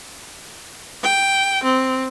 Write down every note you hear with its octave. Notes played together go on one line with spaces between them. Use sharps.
G5
C4